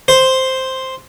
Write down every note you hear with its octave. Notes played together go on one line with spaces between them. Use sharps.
C5